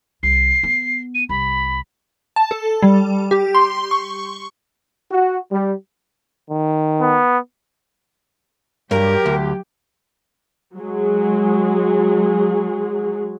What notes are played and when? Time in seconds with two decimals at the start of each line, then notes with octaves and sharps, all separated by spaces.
0.23 C2 C7
0.63 B3
1.14 D#7
1.29 C2 B5
2.36 A5
2.51 A4
2.82 G3
3.31 G4
3.54 C6
3.91 C#6
5.11 F#4
5.52 G3
6.50 D#3
7.01 B3
8.91 G2 F#3 G4 A#4
9.26 D2
10.77 F#3 G#3 G#4